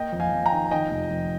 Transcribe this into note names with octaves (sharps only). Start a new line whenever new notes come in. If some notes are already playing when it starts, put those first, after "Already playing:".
Already playing: A#3 D#5 G5
F2
F5 G#5
F2
G5 A#5
D#3
D#3 D#5 G5
F1
F2